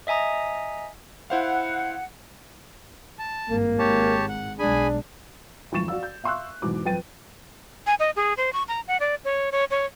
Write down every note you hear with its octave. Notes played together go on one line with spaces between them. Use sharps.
D#5 E5 G#5 A#5 D#6
E4 C5 F5 F#5
A5
G#1 G2 A#3
G#1 G#2 G4 C#5 A5
F#5
B1 G#3 D4 G#4 G#5 B5
G#1 F2 E3 C#6 A6 E7
F#4 D5 F5 E6
G6
E5 F5 C6 C#6 E6 F#6
E2 G#2 B2 D6
F2 B4 G5 A6 D#7
G#5
D#5
G#4
C5
C#6
A#5
F#5
D5
C#5
C#5
C#5